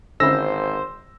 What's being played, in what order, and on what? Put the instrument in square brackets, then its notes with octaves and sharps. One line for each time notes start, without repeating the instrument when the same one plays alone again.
[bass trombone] G#1 [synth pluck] D3 C#4 E4 [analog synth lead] C5 [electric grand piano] E6 A#6